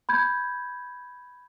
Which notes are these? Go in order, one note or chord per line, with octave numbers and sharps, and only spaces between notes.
B5 G6 G#6